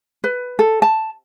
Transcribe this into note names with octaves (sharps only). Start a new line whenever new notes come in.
B4
A4
A5